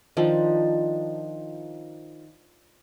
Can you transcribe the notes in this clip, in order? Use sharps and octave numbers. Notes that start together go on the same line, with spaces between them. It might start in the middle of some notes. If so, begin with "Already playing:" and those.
D#3 F3 D4